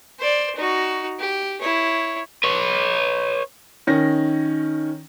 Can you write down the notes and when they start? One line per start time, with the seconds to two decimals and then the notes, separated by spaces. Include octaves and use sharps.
0.19 C5 D5
0.56 D#4 F#4
1.19 G4
1.61 E4 C#5
2.44 B4 C#5
3.87 D#3 C#4 A#6